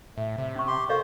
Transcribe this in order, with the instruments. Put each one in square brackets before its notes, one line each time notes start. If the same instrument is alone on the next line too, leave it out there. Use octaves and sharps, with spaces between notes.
[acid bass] A2 [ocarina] E5
[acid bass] C3
[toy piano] C#4 C#6
[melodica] G4 C6
[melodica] F#4 C5 [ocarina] A4 [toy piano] A#4 D#5 F5